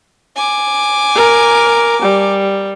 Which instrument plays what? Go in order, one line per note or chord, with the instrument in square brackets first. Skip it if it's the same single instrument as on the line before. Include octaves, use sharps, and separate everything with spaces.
[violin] G#5 D6
[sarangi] A#4
G3